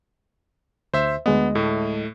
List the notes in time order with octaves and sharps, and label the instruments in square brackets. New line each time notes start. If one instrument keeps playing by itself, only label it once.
[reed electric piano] D2 [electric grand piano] C5 E5
[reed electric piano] D2 G#3 D#5 [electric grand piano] B3
[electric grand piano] A2 A3